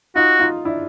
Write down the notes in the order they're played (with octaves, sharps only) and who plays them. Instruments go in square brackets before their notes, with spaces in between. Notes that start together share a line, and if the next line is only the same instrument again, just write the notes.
[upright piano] D#4 F4 [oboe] F#4
[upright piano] D#4 F4
D4 E4